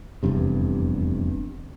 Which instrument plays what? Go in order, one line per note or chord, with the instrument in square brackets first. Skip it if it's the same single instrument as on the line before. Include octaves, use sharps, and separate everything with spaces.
[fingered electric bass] F1 E2 G2 C3